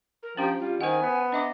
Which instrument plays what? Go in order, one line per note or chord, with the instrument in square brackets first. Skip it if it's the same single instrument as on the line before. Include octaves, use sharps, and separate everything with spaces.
[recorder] A#4
[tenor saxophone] F3 [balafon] C#4 D4 G4 [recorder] G5
[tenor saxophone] G3 [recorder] F4
[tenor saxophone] D#3 [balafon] C5 F#5 [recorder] G#5
[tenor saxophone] B3
[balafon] D4 E5 D6 [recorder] D#5